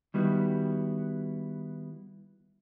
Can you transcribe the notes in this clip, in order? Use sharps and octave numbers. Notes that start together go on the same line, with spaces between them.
D#3 G3 B3 E4 F#4